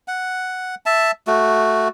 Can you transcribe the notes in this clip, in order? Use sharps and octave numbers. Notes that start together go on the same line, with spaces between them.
F#5
E5 A5
A3 F#4